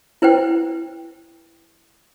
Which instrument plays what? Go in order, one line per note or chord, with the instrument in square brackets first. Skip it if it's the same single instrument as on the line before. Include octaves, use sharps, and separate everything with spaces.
[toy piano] E4 B4 C5 G5